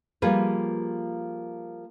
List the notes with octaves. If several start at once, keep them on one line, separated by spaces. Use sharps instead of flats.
F3 G3 A#3 G#4 A#4 B4